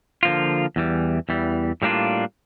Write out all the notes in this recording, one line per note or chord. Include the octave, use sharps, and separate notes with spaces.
D3 F3 A#3 F4
E2 E3 G3
E2 E3 G3
A2 G3 A#3 D4 F4